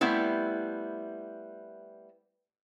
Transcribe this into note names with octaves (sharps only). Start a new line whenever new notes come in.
G3 A3 B3 C4 E4